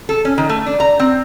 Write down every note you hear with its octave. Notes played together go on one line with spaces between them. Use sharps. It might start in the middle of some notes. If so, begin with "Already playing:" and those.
A4
C#4
D#3
A3
D4
A#5
C4